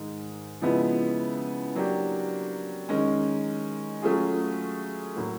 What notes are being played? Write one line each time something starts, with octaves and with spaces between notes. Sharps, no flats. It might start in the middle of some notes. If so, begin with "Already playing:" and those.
Already playing: G#2 D#3 G#3
C#3 F3 G#3 B3 E4
F#3 A#3 D4 G4
D#3 G#3 C#4
F#3 A3 C#4 F4 G#4
A2 F#3 A#3